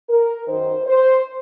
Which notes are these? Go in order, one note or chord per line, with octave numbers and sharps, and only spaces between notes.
A#4
F#2 D#3 C5
C5